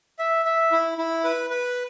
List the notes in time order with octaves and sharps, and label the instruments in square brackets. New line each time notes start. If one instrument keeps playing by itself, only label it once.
[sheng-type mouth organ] E5
E5
E4
E4
B4
B4